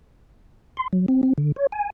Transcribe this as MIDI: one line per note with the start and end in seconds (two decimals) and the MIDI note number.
0.77 0.88 84
0.93 1.06 54
1.08 1.21 60
1.23 1.33 60
1.38 1.52 50
1.56 1.67 73
1.72 1.90 80